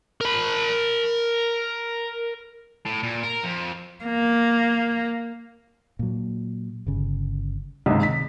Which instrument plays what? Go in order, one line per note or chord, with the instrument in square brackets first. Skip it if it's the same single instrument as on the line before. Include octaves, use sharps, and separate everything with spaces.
[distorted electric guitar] A#4 B5
A2
A#2
A#4
F2
[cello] A#3
[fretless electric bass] A#2 F#3
G1 C#3
[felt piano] C#2 G#2 [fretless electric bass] C3 D#3
[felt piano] B6